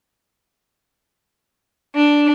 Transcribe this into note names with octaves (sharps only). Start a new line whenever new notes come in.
D4